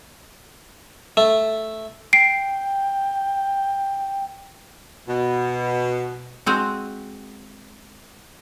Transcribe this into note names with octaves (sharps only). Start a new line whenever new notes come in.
A3
G5 C7 D7
B2
G#3 C4 F#4